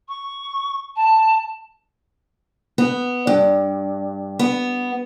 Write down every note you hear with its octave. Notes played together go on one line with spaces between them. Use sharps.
C#6
A5
B3
G2
B3